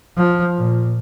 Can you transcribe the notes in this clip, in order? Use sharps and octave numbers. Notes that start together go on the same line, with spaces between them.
F3
A#2